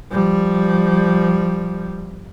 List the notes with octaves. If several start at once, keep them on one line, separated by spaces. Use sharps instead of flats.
F3 G3